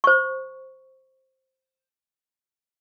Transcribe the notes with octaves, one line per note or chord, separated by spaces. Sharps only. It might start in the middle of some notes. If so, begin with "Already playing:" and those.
C5 C#6